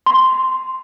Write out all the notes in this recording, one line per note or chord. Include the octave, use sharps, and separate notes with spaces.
C6